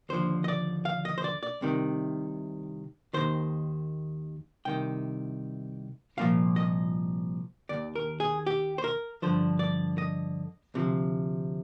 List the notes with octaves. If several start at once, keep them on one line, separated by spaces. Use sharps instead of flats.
D#2 D3 F3 C5
D#5
D5
F5
D#5
C5
D5
D5
C2 C3 D#3
D#2 D#3 C5
C2 C3 D#3 G5
C2 A#2 F3 F5
D#5
D#2 D#3 D5
A#4
G#4
G4
C5
A#4
G2 D3 F3 C5
D5
D#5
D2 C3 F3